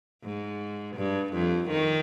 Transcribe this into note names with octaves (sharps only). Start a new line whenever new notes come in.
G#2
G2
F2
D#3